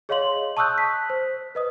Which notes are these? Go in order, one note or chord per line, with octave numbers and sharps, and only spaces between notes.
G#4 C#5 D#5 F5 C6 F#7
A5 C#6 D#6 E6 F#6 G6
B6
C5
B4 D#5 D#6